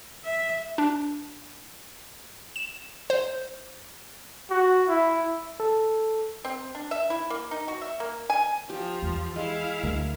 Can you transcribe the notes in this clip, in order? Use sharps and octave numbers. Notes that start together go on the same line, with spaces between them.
E5
D4
E7
C5
F#4
E4
A4
C4
D4
E5
E4
A#3
D#4
F#4
E5
A#3
G#5
F3 G4
E2
G#3 E4 F5
D2 F#3 A#4